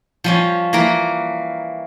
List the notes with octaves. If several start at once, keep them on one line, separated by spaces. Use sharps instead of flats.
F3 G3 C#4
E3 A#3 A#4 A#5